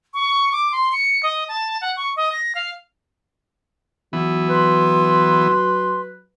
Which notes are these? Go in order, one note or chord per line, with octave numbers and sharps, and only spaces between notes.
C#6
D6
C6
C#7
D#5
A5
F#5
C#6
D#5
A#6
F5
E3 F#3 B3
B4 C6